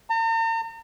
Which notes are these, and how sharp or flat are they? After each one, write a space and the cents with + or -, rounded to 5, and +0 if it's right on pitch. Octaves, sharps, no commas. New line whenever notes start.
A#5 -45